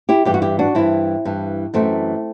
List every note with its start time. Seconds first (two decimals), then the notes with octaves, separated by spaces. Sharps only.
0.09 E4 G4
0.25 G2 E3 E4 G4
0.34 F#4
0.42 E4 G4
0.59 D4 F#4
0.75 G2 E3 C4 E4
1.25 G2 E3
1.74 F#2 E3 A3 C4